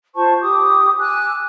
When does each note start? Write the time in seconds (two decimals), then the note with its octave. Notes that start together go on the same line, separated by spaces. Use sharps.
0.15 F4 C5 A5 C#6
0.40 G4 D6 D#6
0.98 G#5 D6 E6 F#6